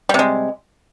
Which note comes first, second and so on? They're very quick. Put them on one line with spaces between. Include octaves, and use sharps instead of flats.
G3 C3 G#3